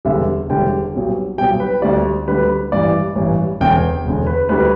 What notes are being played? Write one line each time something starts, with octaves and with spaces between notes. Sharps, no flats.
E1 E2 D3 G3 E5
E1 E2 D3 G3 G5
B1 B2 G3
B1 B2 G3 G5
B4
D2 D3 G3 D5
D2 D3 G3 B4
A1 G2 E3 D5
A1 G2 E3
E1 E2 D3 G5
E1 E2 D3
B4
D2 D3 G3 B4